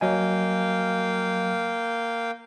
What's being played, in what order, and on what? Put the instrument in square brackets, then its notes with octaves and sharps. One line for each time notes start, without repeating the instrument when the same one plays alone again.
[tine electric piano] F#3 D#5 G#5 [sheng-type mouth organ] A#3 F5 G5